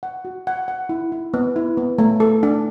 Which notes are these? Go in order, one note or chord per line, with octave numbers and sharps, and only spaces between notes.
F#5
F#4
F#5
F#5
E4
E4
B3
E4
B3
A3
A4
D4